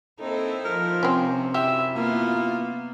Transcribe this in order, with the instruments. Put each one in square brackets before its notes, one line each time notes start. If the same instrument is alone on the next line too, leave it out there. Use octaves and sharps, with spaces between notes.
[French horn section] A#3 C4 A4 [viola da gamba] D#4 E4
[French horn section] F3 [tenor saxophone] A#4
[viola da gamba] C3 [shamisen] C4 C#4
[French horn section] F#2 E4 [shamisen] G4 [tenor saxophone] E5
[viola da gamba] A#3 B3 [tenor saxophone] F4